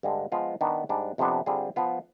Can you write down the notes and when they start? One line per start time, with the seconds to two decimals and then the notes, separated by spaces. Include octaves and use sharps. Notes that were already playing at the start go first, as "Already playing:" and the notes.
0.03 G2 D3 G#3
0.32 F3 G#3 B3 F4
0.61 D#3 B3 D4
0.89 G#2 G3 D4
1.18 F2 C3 F3 B3 D4
1.46 D3 G3 C4 F4 G#4
1.76 F3 B3 F4